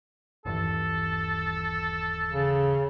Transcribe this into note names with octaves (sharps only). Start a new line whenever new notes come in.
D#1 G2 E3 A4
C#3